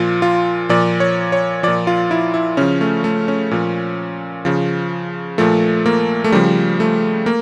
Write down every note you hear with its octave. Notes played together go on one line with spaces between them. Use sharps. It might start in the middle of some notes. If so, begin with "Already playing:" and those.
Already playing: A#2 F3 F4
F4
A#2 F3 D5
C#5
C#5
A#2 F3 D5
F4
E4
E4
C#3 F3 C#4
A3
A3
C#4
A#2 F3
C#3 F3
A#2 F3 A3
A#3
A3
C#3 F3 G3
A3
A#3